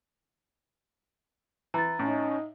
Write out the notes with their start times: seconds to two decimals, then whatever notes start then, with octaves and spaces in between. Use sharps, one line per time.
1.74 E3 A#5 A6
1.99 A2 C#4 D#4